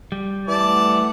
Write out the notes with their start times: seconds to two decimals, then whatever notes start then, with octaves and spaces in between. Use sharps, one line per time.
0.12 G3
0.48 E3 A3 D5 F#5 A5